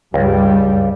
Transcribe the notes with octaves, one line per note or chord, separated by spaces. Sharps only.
C#2 G2 G3